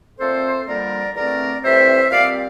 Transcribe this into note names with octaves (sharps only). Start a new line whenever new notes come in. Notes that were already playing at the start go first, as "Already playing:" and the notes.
A#2 A3 C4 A4 C5
F2 D3 G3 A#3 A#4 D5
E2 D3 A3 C4 A#4 D5
A2 E3 G3 C4 C5 E5
A#2 G3 C4 D5 F5